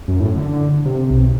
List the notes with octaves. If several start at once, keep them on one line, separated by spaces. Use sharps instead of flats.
F#2
A2
D3
C3
B1